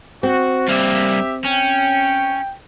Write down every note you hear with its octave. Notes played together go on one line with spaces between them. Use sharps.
C4 F#4
G2 A#3 G4 E5
C#4 G5